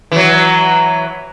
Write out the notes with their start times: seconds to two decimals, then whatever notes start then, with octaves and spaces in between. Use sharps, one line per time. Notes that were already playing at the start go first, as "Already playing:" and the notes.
0.12 E3 F#3